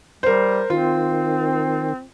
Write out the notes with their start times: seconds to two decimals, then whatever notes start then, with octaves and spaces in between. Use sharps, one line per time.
0.23 G3 A#4 C5
0.70 D#3 C4 F4